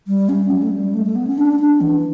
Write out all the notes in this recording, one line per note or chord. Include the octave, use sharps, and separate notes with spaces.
G3
C#4
F#3
A3
G3
A3
A3
B3
C#4
D4
D4
E3